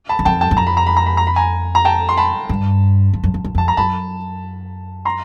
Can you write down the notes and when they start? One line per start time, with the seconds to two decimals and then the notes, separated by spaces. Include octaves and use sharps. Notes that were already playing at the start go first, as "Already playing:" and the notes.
0.09 A5 B5
0.19 E2
0.25 F2 G5 A5
0.41 G5 A5
0.51 F#2
0.57 F2 A#5
0.67 B5
0.77 A#5
0.87 B5
0.97 A#5
1.06 B5
1.17 A#5
1.27 B5
1.36 G#5 A#5
1.75 A#5
1.85 G5 A5
2.09 C6
2.17 A5 B5
2.49 G2
3.14 F2
3.23 F#2
3.34 F2
3.44 F#2
3.55 F2 A5
3.68 A#5
3.77 F#2 A5 B5
5.05 A#5 C6